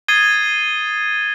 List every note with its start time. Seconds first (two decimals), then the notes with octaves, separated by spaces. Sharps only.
0.08 D#6 G#6 A6 C7 D#7 G7